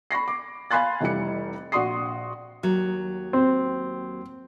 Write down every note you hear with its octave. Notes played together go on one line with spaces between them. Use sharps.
B5 C#6 A#6 C7
D6
F5 G#5 B5 C6 F#6 A6
F1 E3 G3 C#7
A#1 F#4 D5 C6 D#6 C7
D#2 F#3
C4